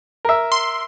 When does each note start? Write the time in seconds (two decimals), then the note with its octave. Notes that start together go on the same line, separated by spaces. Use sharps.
0.25 A#4 E5
0.52 C6